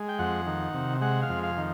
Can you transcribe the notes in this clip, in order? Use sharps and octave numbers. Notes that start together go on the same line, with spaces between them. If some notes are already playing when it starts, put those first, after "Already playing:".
Already playing: G#3
G5
F2 F#5
D#3
C3
G#3 F#5
F5
F2
F5
D#3